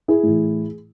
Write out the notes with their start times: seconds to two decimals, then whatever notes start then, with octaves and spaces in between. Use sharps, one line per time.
0.08 E4 G#4
0.23 A2 E3